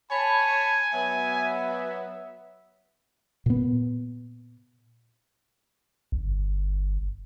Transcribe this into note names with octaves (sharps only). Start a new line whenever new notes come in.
C#5 G#5 A5 B5
F#3 B3 E5
A#2 B3
G1